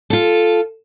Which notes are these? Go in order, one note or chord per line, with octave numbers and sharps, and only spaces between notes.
F4 A4